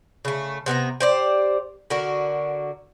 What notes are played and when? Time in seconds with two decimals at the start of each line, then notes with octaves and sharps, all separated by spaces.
0.25 C#3 A3
0.66 C3 B3 E5 A#5
1.00 G4 C5 D5
1.90 D3 F#4 A#4